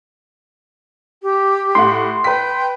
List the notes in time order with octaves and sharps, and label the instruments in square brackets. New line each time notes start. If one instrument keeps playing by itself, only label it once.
[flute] G4
[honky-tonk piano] A2 F#5 [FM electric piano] C6
[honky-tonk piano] B4 B6 [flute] G5